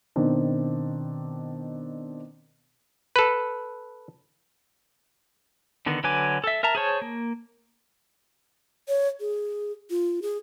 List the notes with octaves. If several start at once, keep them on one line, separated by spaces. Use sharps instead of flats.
B2 D#3 C4 D4
A4 B4
D3 D#3 B3
D3 F#3 B4 G#5 D6
A4 E5
A#4 E5 A5 A#5
G#4 C5 C#5 A5
A#3
C#5
G#4
F4
G#4